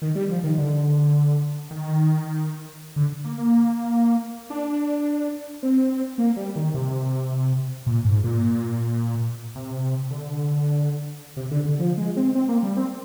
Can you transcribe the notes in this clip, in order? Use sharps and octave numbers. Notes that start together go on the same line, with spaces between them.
D#3
G3
F3
D#3
D3
D#3
D3
A#3
A#3
D4
C4
A#3
G3
D#3
C3
A#2
G#2
A#2
C3
D3
C3
D3
D3
F3
G#3
C4
C4
A#3
G3
C4